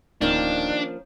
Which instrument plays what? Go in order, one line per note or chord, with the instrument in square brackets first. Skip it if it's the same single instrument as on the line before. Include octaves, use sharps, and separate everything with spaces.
[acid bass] D1 [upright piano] D#3 [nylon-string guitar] F3 A#3 C#4 [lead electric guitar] D4